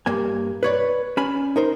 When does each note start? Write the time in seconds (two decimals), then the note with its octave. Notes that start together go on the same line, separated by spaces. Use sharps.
0.06 G2 A#3 G#5
0.63 B4 C#5 D5
1.17 C#4 G#5 B5
1.56 D#4 A#4 C5